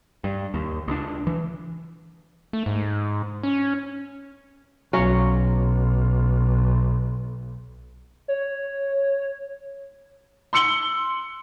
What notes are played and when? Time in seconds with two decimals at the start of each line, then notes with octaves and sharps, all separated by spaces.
0.24 G2
0.54 D#2
0.88 C#2 D4
1.27 E3
2.53 A3
2.66 G#2
3.43 C#4
4.93 B1 F#3 C#4 F5
8.28 C#5
10.53 C6 E6 C#7 F#7 G7